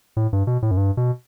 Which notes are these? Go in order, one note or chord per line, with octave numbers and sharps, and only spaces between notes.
A2
G2
B2
A2
F#2
G2
B2